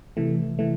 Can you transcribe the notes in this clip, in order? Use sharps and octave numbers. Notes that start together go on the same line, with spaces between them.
C3 E3 A3
E3 A3